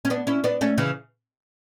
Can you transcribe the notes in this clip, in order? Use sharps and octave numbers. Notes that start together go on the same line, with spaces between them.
C#4
B3 D4
C#4 E4
B3 D4
A3 C#4
C#3 E3